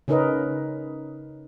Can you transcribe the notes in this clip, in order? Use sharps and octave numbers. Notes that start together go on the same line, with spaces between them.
C#3 C#4 D#4 A#4 B4 D#5